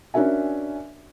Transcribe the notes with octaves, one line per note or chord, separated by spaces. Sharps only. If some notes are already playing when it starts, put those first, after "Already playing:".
C#4 D4 F#4 A#4 E5 G#5